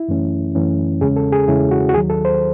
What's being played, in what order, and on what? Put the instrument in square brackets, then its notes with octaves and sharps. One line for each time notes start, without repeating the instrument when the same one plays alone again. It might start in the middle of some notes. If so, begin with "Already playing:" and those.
Already playing: [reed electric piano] E4
F#2 E3 A3 C#4
F#2 E3 A3 C#4
E2 C#3 G#3 C#4 G#4
A4
G#4
E2 C#3 G#3 C#4 E4
F#4
F#4
D#2 D#3 F#3 G#4
A4
C5